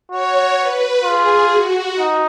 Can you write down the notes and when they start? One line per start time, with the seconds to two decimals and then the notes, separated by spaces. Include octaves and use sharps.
0.11 F#4 C#5
0.59 B4
1.04 F4 G#4
1.51 F#4
1.98 D#4